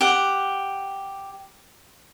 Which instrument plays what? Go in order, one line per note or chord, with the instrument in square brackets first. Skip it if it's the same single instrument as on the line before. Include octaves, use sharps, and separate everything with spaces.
[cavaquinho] G4 F#5